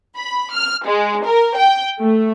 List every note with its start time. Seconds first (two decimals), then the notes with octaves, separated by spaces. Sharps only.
0.18 B5
0.54 F6
0.86 G#3
1.26 A#4
1.56 G5
1.99 A3